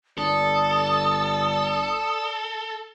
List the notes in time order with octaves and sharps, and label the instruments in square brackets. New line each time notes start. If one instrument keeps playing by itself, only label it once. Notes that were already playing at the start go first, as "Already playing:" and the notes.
[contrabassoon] G1 [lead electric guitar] A4 [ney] D5 [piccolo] D#6